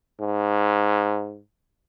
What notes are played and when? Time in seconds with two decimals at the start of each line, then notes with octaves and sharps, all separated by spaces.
0.20 G#2